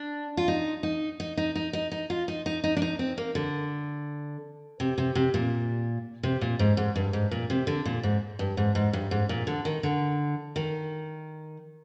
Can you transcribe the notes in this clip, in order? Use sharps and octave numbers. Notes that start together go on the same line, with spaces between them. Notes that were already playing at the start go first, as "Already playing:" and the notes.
Already playing: D4
F4
D#4
D#4
D#4
D#4
D#4
D#4
D#4
F4
D#4
D#4
D#4
D4
D#4
C4
A#3
D3
C3
C3
C3
A#2
C3
A#2
G#2
G#2
G2
G#2
A#2
C3
D3
A#2
G#2
G2
G#2
G#2
G2
G#2
A#2
D3
D#3
D3
D#3